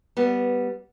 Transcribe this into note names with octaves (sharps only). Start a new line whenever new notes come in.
G3 B3